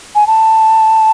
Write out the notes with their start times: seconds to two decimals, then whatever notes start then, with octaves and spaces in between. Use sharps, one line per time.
0.15 G#5
0.27 A5